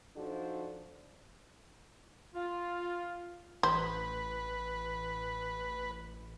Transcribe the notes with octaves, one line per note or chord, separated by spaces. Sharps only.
F3 D4 D#4 F#4 A4 C5
F4
A1 B4 C5